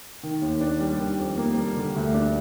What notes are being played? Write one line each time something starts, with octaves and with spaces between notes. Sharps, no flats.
D#3
D#2
D4
G3
D#3
F2
A#3
G3
D3
D2
D4